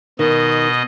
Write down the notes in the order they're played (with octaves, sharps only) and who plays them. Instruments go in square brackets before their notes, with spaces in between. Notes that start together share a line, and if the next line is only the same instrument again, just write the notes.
[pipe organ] B2 D#5 [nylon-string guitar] D#3